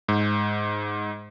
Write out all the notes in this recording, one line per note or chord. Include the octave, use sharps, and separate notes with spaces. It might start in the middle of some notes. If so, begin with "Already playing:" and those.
G#2